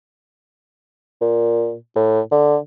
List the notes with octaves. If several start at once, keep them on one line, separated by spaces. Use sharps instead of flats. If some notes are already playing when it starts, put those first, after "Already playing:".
A#2
A2
D3